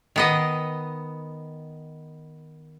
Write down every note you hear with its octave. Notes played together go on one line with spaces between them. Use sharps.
D#3 B3 D#5